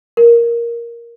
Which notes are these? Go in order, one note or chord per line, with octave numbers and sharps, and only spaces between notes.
A#4